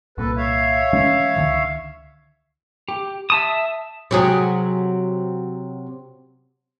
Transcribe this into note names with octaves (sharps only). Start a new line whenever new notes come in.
C2 A#2 A4 B4
C#5 E5 F5
E3 G#3 C#4
C#2 D3 D#3
G4
E5 A5 D#6
C3 F#3 G#4